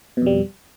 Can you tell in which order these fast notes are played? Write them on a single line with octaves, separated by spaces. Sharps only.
B2 F2 G3